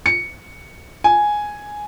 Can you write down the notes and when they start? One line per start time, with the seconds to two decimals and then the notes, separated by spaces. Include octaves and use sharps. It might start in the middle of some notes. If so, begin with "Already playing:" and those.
0.06 C#7
1.04 G#5